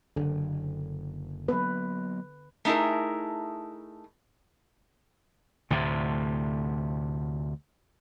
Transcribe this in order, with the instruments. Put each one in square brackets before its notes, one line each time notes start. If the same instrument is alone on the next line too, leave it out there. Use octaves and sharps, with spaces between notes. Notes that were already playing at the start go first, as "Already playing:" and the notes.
[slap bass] F#1 [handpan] D3
[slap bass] F#3 A#3 B3 [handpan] B4
[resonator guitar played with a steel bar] A3 D#4 E4 G#4 A#4
[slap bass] D2 A2 C3